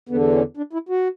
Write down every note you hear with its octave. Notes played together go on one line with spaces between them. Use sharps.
E2 D3 B3
C#4
D4
E4
F#4